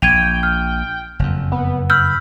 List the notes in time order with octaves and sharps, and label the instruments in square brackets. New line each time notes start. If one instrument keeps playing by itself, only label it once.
[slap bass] A#1 [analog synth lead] G5 [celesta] G#6 D#7 F7
[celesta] F6
[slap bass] F#1 F2
[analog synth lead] B3
[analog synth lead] B5 [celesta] E6 F6 G6